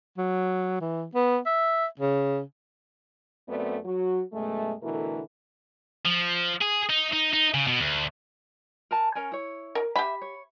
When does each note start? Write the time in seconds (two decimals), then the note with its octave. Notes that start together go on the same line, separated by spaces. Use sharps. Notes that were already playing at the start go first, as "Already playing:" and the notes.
0.18 F#3
0.81 E3
1.15 B3
1.46 E5
1.99 C#3
3.48 F#2 A3 B3 C4 D5
3.85 F#3 F#4
4.33 F#2 B2 G#3 A3
4.82 B2 D3 E3 A3 E4 A#4
6.05 F3
6.61 G#4
6.89 D#4
7.13 D#4
7.34 D#4
7.54 C#3
7.67 B2
7.80 D2
8.91 A#4 G#5 A5
9.15 C#4 A#4 G#5
9.32 E4 C#5
9.75 A#4
9.96 G4 E5 B5
10.22 C#5